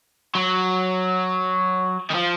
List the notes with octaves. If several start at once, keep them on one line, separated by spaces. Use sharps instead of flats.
F#3
D#3
F3